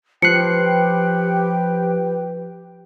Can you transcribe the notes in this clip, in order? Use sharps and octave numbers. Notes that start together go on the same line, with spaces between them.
F3 G4 B4 G5 F#6 C7 C#7